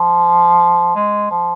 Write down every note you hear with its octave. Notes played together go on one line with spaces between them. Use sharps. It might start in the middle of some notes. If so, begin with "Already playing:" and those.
Already playing: F3
G#3
F3